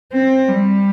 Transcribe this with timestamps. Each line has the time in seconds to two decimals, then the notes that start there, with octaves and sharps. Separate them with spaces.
0.13 C4
0.49 G3